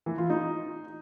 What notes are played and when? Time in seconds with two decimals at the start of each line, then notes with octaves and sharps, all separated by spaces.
0.06 E3
0.18 F4
0.30 D#4